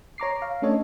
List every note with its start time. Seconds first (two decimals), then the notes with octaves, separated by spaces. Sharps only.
0.18 C#5 A#5 D6 C7
0.42 F5
0.62 A3 C#4 D4 A4 C#5 D#5